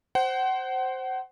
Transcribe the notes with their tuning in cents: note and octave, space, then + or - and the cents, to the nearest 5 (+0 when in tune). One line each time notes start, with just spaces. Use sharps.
C5 +0 F#5 +35